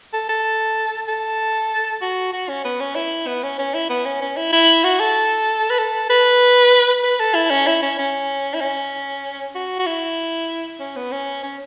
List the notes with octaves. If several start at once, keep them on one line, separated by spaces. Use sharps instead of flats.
A4
A4
A4
F#4
F#4
C#4
B3
C#4
E4
B3
C#4
C#4
E4
B3
C#4
C#4
E4
E4
F#4
A4
B4
A4
B4
B4
A4
E4
C#4
E4
C#4
C#4
E4
C#4
F#4
F#4
E4
C#4
B3
C#4
C#4